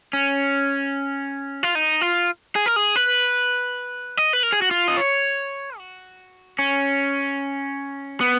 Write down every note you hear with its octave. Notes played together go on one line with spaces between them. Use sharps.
C#4
F4
D#4
F4
G#4
A#4
G#4
B4
D#5
B4
A#4
G#4
F#4
F4
D#5
C#5
F#4
C#4
B3